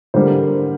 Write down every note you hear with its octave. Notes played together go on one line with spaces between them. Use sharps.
D3 G3 A#3 C5